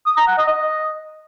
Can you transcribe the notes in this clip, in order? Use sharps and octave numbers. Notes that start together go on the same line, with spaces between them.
D#6
A#5
F#5
D#5
D#5